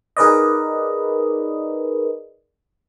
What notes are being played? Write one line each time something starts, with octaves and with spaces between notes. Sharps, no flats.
D#4 G#4 A#4 B4 D5 D#5